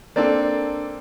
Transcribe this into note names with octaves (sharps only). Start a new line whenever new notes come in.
A#3 C4 D4 A4 D5